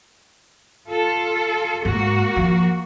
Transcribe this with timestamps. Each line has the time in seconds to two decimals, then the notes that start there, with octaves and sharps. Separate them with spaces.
0.88 F4 A4
1.85 G#2 A#3 F#4
2.36 F3